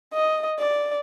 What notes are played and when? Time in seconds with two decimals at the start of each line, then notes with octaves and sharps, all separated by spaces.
0.13 D#5
0.59 D5